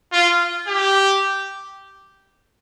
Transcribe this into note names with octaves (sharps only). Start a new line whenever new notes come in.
F4
G4